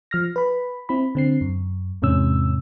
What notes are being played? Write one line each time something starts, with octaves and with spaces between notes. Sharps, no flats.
F3 F6 A#6
B4 B5
C4 E4 B5
D3 C4 C7
F#2
E2 G#2 C3 C#4 E6